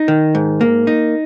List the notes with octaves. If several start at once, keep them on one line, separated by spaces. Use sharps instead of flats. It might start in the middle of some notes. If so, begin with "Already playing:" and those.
Already playing: D#4
D#3
G#2
A#3
D#4